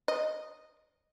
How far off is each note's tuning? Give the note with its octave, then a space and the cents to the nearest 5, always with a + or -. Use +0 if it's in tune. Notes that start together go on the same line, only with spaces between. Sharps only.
D#5 -5